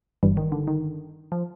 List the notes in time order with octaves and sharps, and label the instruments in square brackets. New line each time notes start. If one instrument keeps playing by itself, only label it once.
[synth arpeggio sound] G1 G2 E3 G3
[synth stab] D#3
D3
D#3
F3